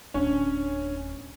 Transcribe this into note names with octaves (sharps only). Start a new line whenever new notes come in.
D1 C#4 D4